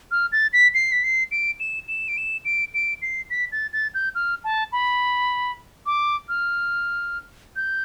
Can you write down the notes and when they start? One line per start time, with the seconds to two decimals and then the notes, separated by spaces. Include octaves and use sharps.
0.11 F6
0.32 A6
0.53 B6
0.74 C7
0.92 B6
1.04 C7
1.31 D7
1.60 E7
1.88 E7
2.08 D7
2.17 E7
2.45 D7
2.74 D7
3.02 C7
3.30 B6
3.52 A6
3.73 A6
3.94 G6
4.15 F6
4.44 A5
4.72 B5
5.86 D6
6.29 F6
7.56 G6